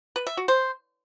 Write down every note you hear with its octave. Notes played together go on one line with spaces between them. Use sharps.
B4
E5
F#4
C5